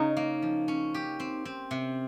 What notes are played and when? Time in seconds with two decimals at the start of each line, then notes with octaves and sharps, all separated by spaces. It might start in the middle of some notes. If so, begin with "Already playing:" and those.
Already playing: C#3 D#4
0.17 A#3
0.42 F3
0.68 C#4
0.94 G4
1.20 C4
1.45 C4 C#4
1.71 C3